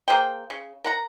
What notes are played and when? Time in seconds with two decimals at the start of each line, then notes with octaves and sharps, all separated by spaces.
0.08 A#3 G#4 C5 G5
0.50 C#3
0.84 A#4 F#5 A#5